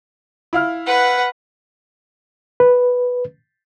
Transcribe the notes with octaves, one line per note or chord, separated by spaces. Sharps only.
E4 F5 F6
B4 F#5
B4